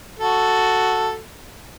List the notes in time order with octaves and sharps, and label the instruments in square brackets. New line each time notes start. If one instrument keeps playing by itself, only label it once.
[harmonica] F#4 A4